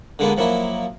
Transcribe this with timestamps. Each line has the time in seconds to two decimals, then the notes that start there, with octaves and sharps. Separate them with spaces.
0.19 D3 G#3 A#3 B3
0.37 F3 F#3 A#3 E4